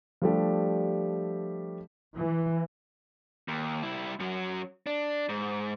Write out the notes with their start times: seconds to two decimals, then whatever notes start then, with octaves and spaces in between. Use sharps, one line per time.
0.22 F3 G3 A3 D4 G4
2.16 E3
3.48 D#2
3.83 G3 E4
4.20 F#2 F#3
4.87 D4
5.29 G#2